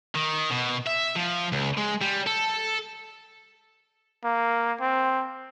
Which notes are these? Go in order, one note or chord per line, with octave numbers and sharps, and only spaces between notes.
D#3
B2
E5
F3
C#2
G#3
G3
A4
A#3
C4